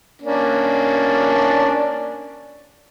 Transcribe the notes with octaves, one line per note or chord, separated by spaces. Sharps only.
A#3 C#4 D4